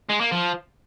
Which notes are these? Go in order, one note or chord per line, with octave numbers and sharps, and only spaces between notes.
G#3
A#3
F3